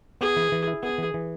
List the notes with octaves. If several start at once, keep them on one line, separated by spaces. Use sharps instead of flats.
B3 G#4
E3
E3
E4
B3 G#4
E3
E3